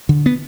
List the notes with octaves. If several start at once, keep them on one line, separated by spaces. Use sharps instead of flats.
D3
B3